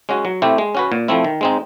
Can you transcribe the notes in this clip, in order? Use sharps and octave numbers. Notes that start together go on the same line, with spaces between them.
G#3 C#4 F#4
F#3
A3 C4 E4 G4
G#3
C#4 F#4 B4
A#2
F3 A3 C4 E4
D#3
G#3 C4 D#4